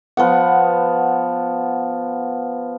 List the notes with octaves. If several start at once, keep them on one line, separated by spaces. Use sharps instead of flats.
F3 B3 F#5